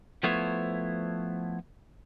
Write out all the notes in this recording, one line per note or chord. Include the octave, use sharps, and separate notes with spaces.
F3 A3 B3 E4 C5 C#5